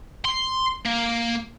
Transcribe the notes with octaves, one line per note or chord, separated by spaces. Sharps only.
C6
A#3